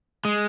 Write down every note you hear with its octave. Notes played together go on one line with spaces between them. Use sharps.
G#3